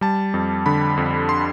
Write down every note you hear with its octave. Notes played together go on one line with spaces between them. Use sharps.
G3 A5
F2
D3 B5
F2
C6